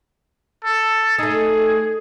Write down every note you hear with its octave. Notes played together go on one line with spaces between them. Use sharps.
A4
A3 D#4 G#4